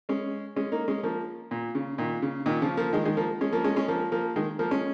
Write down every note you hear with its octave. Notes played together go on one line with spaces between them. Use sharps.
G#3 C#4
G#3 C#4
A#3 D#4
G#3 C#4
F3 A#3
A#2
C#3
A#2 D#3
C#3
A#2 D#3
C#3 F3
F3 A#3
D#3 G#3
D#3 G#3
F3 A#3
G#3 C#4
F3 A#3
G#3 C#4
G#3 C#4
F3 A#3
F3 A#3
D#3 G#3
F3 A#3
G#3 C#4